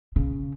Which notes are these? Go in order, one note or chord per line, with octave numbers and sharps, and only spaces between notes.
C#3